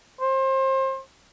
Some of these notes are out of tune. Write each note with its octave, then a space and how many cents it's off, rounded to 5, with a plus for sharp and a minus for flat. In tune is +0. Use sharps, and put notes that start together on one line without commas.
C5 +30